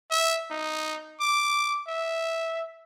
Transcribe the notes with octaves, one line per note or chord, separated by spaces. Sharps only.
E5
D#4
D6
E5